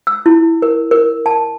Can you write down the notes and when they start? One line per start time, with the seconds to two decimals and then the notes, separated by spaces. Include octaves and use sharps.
0.07 E6
0.26 E4
0.62 A#4
0.91 A#4
1.26 A5